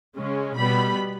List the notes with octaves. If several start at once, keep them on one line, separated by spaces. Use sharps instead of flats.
C#3 G#3 C#4
B2 G3 B3 B5